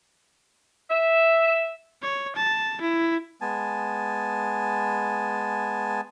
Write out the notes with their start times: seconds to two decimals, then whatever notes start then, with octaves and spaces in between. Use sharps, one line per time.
0.90 E5
2.02 C#5
2.36 A5
2.82 E4
3.41 G#3 B3 G#5 A5